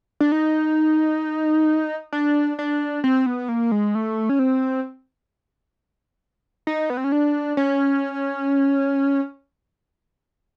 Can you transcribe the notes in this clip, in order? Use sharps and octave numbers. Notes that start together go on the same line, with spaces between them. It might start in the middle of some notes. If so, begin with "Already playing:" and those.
D4
D#4
D4
D4
C4
B3
A#3
G#3
A3
C#4
C4
D#4
B3
C4
C#4
D4
C#4